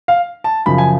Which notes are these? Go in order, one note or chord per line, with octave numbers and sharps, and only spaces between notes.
F5
A5
F#2 C#3 F3 B5
G#5